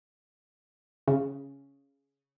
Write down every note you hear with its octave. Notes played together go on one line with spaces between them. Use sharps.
C#3